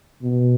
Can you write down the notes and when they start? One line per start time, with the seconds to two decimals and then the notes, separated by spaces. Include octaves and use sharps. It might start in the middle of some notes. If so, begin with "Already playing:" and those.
0.23 B2